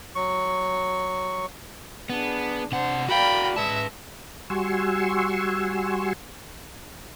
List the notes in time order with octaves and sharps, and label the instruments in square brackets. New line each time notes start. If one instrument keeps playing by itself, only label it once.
[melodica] F#3 C#6
[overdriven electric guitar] B3 [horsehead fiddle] D4 G#4
[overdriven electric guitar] C3 F#5 [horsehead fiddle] D4 C5
[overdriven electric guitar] F#4 F5 [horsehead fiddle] A#4 D5 [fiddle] G5 B5
[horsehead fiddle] G#3 [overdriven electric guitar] B4 A5 [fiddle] E5
[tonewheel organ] G3 F#4 G#5 C6 C#6 E6